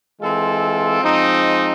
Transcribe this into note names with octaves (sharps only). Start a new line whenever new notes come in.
E3 G#3 C4 F4 A4
F3 G#3 C4 D#4